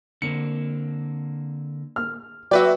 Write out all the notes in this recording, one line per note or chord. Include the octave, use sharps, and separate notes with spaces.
D3 A#3 C4 C#7
F6
F#3 F#4 B4 D5 E5 G5